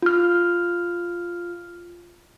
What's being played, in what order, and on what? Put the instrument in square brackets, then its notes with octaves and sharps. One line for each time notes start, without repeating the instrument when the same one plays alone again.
[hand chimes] F4 F6